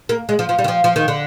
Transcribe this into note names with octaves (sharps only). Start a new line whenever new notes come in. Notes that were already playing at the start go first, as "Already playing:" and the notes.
A#3
G#3
F3
F3
G3
D#3
F3
F3
D#3
D3